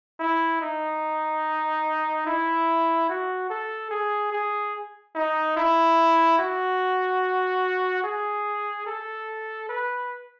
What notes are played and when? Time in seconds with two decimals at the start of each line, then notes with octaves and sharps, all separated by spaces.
0.20 E4
0.61 D#4
2.27 E4
3.09 F#4
3.50 A4
3.91 G#4
4.32 G#4
5.15 D#4
5.57 E4
6.39 F#4
8.04 G#4
8.86 A4
9.69 B4